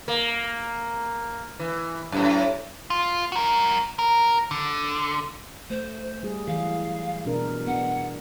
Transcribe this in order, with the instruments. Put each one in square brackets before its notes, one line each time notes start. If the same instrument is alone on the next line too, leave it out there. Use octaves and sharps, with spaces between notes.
[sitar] A#3
E3
F#2 A2
[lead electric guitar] F4
F#4 A#4
A#4
D3
[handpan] A3 [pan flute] C5
[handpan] G3 G#4
[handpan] E3 F#3 G#4 [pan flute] F5
[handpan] B2 D4 A#4
[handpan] B3 D4 [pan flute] F#5